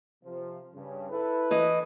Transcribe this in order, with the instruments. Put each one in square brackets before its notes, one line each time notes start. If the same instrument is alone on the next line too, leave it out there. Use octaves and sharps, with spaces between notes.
[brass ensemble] C3 F3
G2 C#3
E4 A4 B4
[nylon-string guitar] E3 D#5